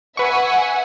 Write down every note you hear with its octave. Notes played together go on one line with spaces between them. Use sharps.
B4 E5 F#5 G#5 C#6